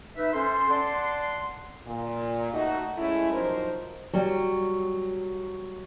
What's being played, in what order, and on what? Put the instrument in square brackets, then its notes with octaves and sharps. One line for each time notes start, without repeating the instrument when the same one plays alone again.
[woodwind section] D#4 B4 E5
C#4 A4 C5 C6
D5 F#5 A5 C6
[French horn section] A#2
A3 D#4 F#4
G#3 A3 C#4 E4
F3 F#3 D#4 A#4 C5
[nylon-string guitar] F#3 G3